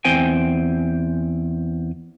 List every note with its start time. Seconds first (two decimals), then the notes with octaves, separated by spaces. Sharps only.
0.05 E2 C4 C5 G5 G#5